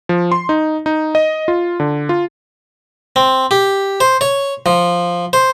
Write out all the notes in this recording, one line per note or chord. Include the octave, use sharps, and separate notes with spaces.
F3
C6
D#4
D#4
D#5
F4
D3
F4
C4
G4
C5
C#5
F3
C5